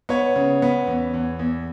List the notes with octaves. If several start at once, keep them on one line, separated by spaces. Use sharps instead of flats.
B3 C#5
C#3
B3
E2
E2
E2